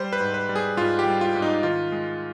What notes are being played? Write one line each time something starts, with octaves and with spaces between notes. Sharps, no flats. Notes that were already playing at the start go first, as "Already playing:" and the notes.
Already playing: G3 C5
B4
G#2
B4
G3
G#4
G#2 F4
G4
G3
F4
G#2
D#4
D#3 F4
G#3